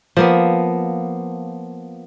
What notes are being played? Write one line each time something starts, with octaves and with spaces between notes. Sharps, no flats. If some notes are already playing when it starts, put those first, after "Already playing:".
F3 A#3 B3